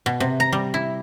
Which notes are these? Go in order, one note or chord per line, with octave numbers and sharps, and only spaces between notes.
B2
C3
A#5
G3
E4